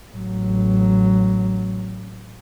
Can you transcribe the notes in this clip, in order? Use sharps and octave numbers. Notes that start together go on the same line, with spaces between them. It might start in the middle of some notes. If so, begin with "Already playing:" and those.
A1 F#3